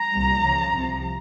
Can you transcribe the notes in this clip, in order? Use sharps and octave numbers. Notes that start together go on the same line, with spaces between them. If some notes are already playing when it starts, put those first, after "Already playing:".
Already playing: A#5
C2 A#2 G3
C#2 C#3 F3
C2 C3 F3